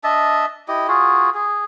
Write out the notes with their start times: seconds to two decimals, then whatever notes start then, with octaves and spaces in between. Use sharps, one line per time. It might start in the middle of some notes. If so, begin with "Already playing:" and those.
0.04 D4 D#5 E5 A5
0.68 E4 G4 D#5
0.88 F4 F#4 G#4
1.34 G#4